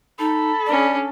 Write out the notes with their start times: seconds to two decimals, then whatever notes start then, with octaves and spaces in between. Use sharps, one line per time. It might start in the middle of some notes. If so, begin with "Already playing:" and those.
0.19 D#4 A4 B5
0.67 C#4 D4 D5